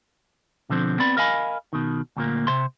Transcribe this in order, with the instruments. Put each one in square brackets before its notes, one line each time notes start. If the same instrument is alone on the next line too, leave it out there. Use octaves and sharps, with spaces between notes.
[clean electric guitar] B2 D3 F3 C4
B3 C4 D5 B5
A#4 D#5 F5 G#5 B5
B2 D#3
D2 A#2 A#3
C3 C5 C6